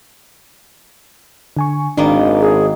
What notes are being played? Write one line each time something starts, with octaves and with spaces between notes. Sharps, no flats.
D3 G#5 C#6
G#1 D#3 A#3 B3 D4
G#4